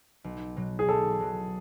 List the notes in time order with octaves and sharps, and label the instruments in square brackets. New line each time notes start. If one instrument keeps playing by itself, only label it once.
[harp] B1
B2 F#3
[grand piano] G#4
[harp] B1 [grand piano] A4
[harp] B2 F#3